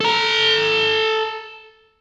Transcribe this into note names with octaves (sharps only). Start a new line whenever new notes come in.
A4 A#5